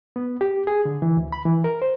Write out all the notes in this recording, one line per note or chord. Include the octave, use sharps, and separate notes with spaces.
B3
G4
G#4
D3
E3
D2
B5
E3
A#4
C5